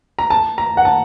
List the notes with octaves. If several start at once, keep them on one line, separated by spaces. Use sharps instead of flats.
A#5
A5
A#5
F#5
A5